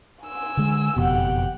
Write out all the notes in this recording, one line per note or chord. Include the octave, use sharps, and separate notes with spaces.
G#5 E6
D3 G#3
F#1 F2 B2 G4 F#5